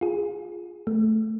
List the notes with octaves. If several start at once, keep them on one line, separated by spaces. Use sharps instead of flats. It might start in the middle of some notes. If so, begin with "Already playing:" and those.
F4 G#4
A3